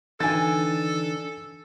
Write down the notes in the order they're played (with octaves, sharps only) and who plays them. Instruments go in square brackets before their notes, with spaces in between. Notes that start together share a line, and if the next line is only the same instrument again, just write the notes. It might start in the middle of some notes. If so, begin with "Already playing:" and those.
[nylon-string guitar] D3 D4 G5 [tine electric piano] E3 D#4 [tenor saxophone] A4 [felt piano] G#5 A6